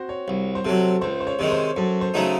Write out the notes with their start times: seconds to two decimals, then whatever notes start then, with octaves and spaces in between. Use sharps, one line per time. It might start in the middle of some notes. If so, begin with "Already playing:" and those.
Already playing: C4 F#4 C5
0.09 C#5
0.28 C2
0.55 C5
0.65 C3 F#3 A4
1.01 C#2 C5
1.21 C5
1.27 C#5
1.39 C3 D#3 G#3 C#5
1.52 C5
1.76 F#2 A4
2.01 C5
2.14 C#3 F#3 A3 D#4